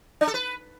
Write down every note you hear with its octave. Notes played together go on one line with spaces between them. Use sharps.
D4
A4
B4